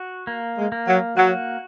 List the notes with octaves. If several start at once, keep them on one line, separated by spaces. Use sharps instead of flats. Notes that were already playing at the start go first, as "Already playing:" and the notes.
Already playing: F#4
A#3
G#3
A#3
F#3
F#3 F#4